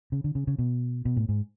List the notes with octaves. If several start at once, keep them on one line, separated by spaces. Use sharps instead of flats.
C#3
D3
C#3
C#3
B2
B2
A2
G#2